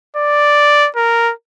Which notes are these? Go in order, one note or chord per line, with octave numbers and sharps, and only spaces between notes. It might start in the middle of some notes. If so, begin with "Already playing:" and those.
D5
A#4